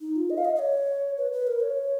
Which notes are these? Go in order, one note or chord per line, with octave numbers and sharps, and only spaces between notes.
D#4
F4
D#5
F5
D#5
D#5
C#5
B4
B4
A#4
C#5